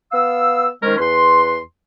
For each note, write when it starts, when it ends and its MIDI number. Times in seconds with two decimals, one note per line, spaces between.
0.12 0.68 59
0.12 0.68 77
0.12 0.68 88
0.83 0.97 51
0.83 0.97 56
0.83 0.97 61
0.83 0.97 70
0.83 0.97 72
0.98 1.59 40
0.98 1.59 71
0.98 1.59 84